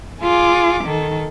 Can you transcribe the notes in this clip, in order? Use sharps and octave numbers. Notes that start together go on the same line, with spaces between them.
F4 G#4 D6
D#3 A4